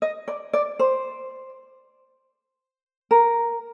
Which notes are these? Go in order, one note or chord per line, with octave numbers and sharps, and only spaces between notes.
D#5
D5
D5
C5
A#4